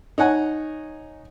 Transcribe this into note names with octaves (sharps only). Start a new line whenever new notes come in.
D#4 C#5 F#5 G#5